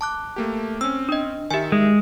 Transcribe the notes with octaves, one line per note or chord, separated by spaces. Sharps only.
A5 D6 F#6
A3 A#3 G4
C4 C#4 E6
D4 D#5
D#3 G4 E5 G#5
G#3